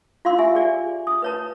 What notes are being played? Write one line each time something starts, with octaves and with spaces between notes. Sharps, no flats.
F4 F5 C6 E6
G4 E5 G#5
G#4 D5 G#5
D#6
B4 C#5 A5